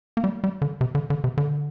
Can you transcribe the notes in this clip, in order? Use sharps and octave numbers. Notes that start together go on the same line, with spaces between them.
A#3
G3
G3
D3
C3
D3
D3
C3
D3